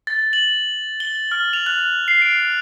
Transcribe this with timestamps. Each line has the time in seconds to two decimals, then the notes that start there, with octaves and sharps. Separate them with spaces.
0.07 A6
0.33 F#7
1.00 G7
1.31 F6
1.53 F7
1.66 F#6
2.08 C7
2.22 D7